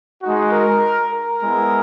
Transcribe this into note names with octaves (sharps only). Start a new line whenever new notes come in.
G#3 D#4 F#4
A#4
A#4
G#3 B3 E4